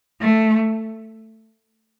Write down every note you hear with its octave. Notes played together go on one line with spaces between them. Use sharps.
A3